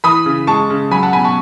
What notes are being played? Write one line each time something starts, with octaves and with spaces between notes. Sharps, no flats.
E3 B5 D#6
C#3
G#3 A5 C#6
C#3
F#3 G#5 B5
F#5 A5
B2 G#5 B5
A5 C#6